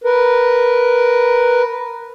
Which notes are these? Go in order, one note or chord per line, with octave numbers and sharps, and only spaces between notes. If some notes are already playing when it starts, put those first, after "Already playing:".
A#4 B4